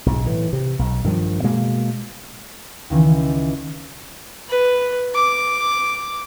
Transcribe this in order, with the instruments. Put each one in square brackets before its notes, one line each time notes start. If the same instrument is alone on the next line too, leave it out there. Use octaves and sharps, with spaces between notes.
[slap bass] B1 G#2
A2 E3
C3
B1
G2 D#3 F3
B2 G#3 A#3
[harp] C#2 D#3 E3 G6
[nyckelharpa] B4
D6